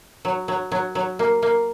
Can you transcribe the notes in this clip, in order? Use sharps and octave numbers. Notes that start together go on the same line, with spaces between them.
F#3
F#3
F#3
F#3
A#3
A#3